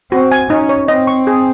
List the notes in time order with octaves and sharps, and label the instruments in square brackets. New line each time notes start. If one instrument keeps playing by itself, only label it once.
[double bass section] C4 [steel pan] F#4
[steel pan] G#5
[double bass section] C#4 [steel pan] D#4
[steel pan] C#5
[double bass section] C4 [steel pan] D#5
[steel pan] C#6
G#4